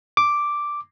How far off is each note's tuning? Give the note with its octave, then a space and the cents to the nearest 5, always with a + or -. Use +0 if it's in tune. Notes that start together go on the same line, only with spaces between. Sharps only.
D6 +0